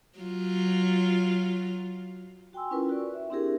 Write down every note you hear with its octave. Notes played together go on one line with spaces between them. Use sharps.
F#3 F4
F#4 G5 G#5 C6 E6
C#4 E4 F4 A#4 B4
F#4 D5
E5
C4 D4 E4 G4 G#4 A#4